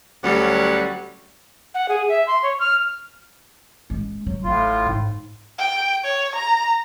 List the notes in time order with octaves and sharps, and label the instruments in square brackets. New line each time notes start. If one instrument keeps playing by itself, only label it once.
[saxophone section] D2 F#3 G3 C#4 F#5
[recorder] F#5
G#4
E5
C6
C#5
F6
[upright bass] G#3 C#4
F#3
[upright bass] A1 [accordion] A2 F4
[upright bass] G#2
[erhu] G5
C#5
A#5